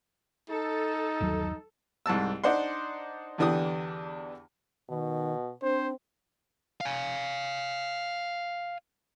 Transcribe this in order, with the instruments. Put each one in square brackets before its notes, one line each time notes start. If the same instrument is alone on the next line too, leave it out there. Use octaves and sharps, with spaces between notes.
[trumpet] D#4 [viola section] A4
[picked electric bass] G1 D#2 F#3
[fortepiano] C2 G#2 A5 E6
D4 D#4 C5 D5 F#5 C6
E2 D3 E3 D4 G4 D#6
[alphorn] B2 [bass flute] D#3
[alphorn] C4 [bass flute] D4 [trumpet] C5
[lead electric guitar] F5 G#5